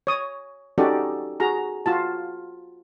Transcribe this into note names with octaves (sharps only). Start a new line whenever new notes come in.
C#5 D#6
C#4 D#4 F#4 G4 A4 D5
F#4 G#4 A#5
F4 F#4 A5